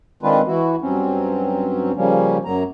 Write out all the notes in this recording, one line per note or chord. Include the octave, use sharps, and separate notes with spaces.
D#3 G#3 C4 D4 F4 B4
E3 E4 F#4
G2 F#3 C4 C#4
C#3 F3 G3 A#3 C#4
F#2 F#3 A#3 A#5